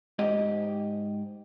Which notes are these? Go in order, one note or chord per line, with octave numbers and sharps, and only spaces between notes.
G#2 G4 D#5